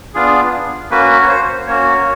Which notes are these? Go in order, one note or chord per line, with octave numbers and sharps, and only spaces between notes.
B3 D4 F4 G#4
A#3 C#4 F#4 B4
C#5
C5
A#3 C#4 F#4 C#5